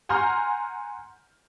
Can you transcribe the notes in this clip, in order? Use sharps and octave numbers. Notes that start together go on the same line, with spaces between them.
F#5 G#5 A#5 C6 F6 G6